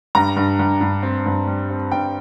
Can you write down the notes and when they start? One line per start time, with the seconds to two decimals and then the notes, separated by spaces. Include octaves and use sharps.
0.15 G2 A#5
0.36 G2
0.59 G2
0.81 G2
1.03 C4
1.26 G2
1.47 G3
1.70 C4
1.92 G2 G5